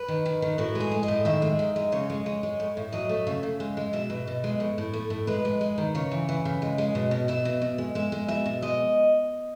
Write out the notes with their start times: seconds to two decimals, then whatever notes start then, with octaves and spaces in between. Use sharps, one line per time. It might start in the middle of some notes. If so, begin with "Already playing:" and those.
Already playing: B4
0.08 D#3
0.26 D#3
0.42 D#3
0.58 A2 F#4
0.75 G#3
0.80 G#4
0.92 G#3
1.03 D#5
1.08 A2
1.25 D#3 E5
1.42 G#3
1.59 D#3
1.76 G#3
1.92 C#3 C#5
2.10 G#3
2.26 G#3
2.43 G#3
2.60 A2
2.77 A2
2.92 F#3 D#5
3.09 A3
3.27 C#3 E5
3.43 C#3
3.60 G#3
3.77 G#3
3.93 B2 E5
4.10 B2
4.27 B2
4.44 G#3
4.60 A2
4.78 A2
4.93 A3
5.10 A2
5.27 G#3 B4
5.45 G#3
5.61 G#3
5.78 D#3
5.95 C#3 C#5
6.11 E3
6.29 E3
6.45 C#3
6.62 G#3
6.78 G#3
6.95 B2
7.11 B2
7.28 B2 E5
7.45 B2
7.62 B2
7.78 G#3
7.95 G#3 E5
8.12 G#3
8.28 B2 E5
8.46 B2
8.62 G#3 D#5